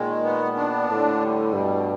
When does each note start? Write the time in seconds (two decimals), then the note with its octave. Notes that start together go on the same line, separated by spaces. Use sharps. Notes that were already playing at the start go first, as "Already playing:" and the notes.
Already playing: A#2 D#3 G#3
0.24 B3
0.57 D4
0.89 A2 D3
1.21 G3
1.53 G2 B2